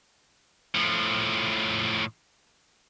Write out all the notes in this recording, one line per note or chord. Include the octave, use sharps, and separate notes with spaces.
A2 F3